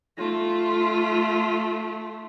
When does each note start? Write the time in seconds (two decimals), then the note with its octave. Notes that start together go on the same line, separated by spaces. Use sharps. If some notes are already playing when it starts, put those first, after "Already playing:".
0.18 A3 F4